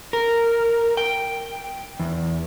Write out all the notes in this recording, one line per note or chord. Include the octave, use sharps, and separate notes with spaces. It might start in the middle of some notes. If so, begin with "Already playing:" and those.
A#4
G5
E2